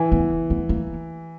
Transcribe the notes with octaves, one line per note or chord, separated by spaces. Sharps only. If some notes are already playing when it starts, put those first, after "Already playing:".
Already playing: E3
B3
B3
A#3